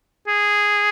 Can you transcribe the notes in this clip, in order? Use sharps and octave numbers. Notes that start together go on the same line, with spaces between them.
G#4